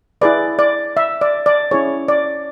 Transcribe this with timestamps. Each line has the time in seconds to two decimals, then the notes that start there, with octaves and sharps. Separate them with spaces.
0.21 E4 G#4 B4 D5
0.59 D5
0.97 E5
1.21 D5
1.46 D5
1.71 C#4 E4 G#4 C#5
2.08 D5